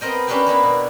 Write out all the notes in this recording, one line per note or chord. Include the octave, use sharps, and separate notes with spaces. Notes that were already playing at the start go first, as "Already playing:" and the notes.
B3 C4 A#4 D#5 G5
C#4 D4 G4 B4 F5 G5
A#3 B3 D4 E4
B2